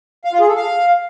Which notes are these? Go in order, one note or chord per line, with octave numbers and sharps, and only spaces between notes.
F5
F4
G#4
A4
F5